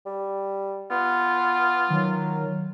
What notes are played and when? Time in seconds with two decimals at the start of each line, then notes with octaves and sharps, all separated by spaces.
0.06 G3
0.91 B3 F4
1.90 D#3 F#3